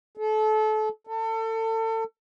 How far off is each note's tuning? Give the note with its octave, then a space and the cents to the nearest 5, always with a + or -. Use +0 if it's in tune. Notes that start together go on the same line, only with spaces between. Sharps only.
A4 -30
A4 +30